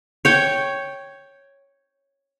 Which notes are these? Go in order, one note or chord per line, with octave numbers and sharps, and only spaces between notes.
C#5 G5